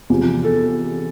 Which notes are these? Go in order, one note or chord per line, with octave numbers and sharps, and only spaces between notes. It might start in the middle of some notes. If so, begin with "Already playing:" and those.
E2 C3 F3
A4